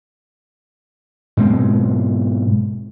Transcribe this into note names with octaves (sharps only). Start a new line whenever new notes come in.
G#2 B2 G#3 C4